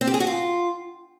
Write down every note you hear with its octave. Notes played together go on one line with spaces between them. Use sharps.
C4
G4
G#4
F#4
F4